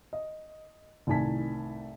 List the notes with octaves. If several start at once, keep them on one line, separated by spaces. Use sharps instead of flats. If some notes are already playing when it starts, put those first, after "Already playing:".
D#5
C2 A2 D#3 G#5 A5 B6